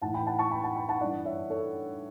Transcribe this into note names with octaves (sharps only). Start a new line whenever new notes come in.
A2 E3 F#5 A5
G5 B5
F#5 A5
A5 C#6
G5 B5
F#5 A5
G5 B5
F#5 A5
G2 E3 D5 F#5
C#5 E5
A4 C#5